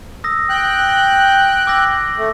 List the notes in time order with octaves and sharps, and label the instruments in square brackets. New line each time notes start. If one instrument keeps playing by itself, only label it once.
[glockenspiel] D#6 E6 A#6
[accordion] G5 F#6
[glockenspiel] A#6
D6 E6 A#6
[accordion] A3